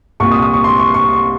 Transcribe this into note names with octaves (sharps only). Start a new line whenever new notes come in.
C2 A#2 C#6
D#6
D#6
C#6
C6
C#6
C#6